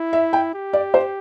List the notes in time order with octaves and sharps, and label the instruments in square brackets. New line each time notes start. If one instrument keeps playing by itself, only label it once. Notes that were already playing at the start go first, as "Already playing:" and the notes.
Already playing: [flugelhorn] E4
[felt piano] E5
G5
[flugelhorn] G4
[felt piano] D5
C5